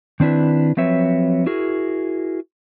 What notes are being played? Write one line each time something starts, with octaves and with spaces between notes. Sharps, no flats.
D#3 C4 D4 E4 B4
F3 F#3 C4 B4 C#5 E5
E4 F#4 G#4 A#4